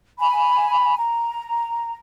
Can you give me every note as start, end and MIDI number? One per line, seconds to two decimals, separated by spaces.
0.19 0.95 80
0.19 0.95 83
0.97 1.97 82